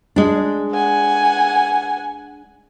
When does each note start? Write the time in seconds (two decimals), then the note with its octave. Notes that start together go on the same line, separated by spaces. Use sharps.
0.16 G#3 D4
0.73 F#5 G#5